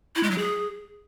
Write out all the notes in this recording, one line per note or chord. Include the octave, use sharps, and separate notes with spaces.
E4
G#3
F#3
G#4